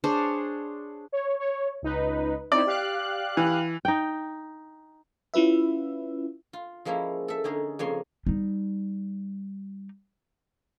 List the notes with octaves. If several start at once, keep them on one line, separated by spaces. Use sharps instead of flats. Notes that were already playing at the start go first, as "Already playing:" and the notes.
D4 G#4 C5 C#5
C#5
C#5
C#2 D#4 B4
C4 D#4 E4 D5
G4 F5 F#6
E3
D#4 G5
C#4 E4 F4 B4 E5
F4
F3 G#3 A#3 C#4 E4
A4 E5
D3 C#4 D#4 G#4
F2 C#3 A#3 C#5 G#5 C6
G3 D#4